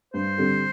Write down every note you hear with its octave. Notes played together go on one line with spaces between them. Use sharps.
G2 C5
D3 G3 C4